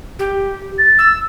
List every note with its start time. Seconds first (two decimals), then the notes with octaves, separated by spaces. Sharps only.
0.19 G4
0.79 A6
0.99 E6